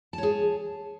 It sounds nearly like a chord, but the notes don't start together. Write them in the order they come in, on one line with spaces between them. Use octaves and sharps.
A5 C#5 G#4